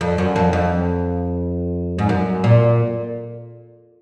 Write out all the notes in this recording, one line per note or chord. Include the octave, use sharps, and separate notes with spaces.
F2
F#2
F2
F2
G#2
F#2
A#2